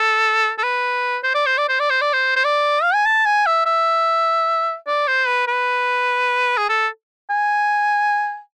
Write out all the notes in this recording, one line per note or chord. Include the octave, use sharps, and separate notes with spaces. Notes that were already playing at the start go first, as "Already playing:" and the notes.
Already playing: A4
A4
B4
C5
D5
C5
D5
C5
D5
C5
D5
C5
C5
D5
F5
G#5
A5
G#5
E5
E5
D5
C5
B4
B4
G#4
A4
G#5